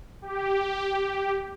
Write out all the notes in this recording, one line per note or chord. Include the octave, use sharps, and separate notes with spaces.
G4